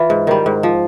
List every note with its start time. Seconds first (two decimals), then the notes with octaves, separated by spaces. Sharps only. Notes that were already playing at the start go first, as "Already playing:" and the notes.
Already playing: E3 F4
0.10 G#2
0.27 D#3 G3
0.46 G#2
0.63 F3